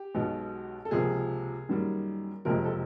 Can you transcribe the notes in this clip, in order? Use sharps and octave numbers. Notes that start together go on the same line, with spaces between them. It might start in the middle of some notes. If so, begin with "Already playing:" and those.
Already playing: G4
B1 B2 G#3 B3
A4
C#2 C3 F3 A#3 G#4
F#2 D#3 G3 A#3
F#1 F2 C3 F3 G#3 A#4
A4